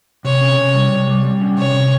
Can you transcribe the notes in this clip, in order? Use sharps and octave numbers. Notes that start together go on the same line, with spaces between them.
C3 C#5
C#4
C3
G3
C3
G3
G3
C#4
C3 C#5
C3